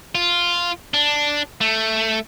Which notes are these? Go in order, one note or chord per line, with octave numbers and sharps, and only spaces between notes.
F4
D4
A3